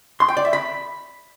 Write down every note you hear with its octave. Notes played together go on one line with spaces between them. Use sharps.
C6
G5
D5
E5
B5